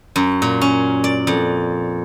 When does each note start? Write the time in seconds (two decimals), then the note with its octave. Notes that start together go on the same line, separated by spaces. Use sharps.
0.16 F#2
0.42 A#2
0.61 C#4
1.04 D5
1.27 F2